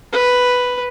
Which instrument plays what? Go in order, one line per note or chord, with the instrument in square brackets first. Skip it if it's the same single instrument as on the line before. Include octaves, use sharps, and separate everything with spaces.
[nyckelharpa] B4